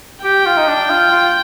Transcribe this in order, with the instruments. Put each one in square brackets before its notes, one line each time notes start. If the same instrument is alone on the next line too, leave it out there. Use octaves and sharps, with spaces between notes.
[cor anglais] G4 [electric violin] G5
[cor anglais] F4
D#4
D4
F4
F4